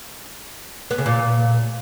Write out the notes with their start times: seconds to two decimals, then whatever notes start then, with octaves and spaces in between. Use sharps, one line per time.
0.91 B3
0.98 C#3
1.06 A#2